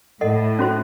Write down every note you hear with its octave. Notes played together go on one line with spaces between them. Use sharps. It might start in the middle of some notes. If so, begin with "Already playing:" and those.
A2 A4 D#5 F#5
C#4 F#4 C5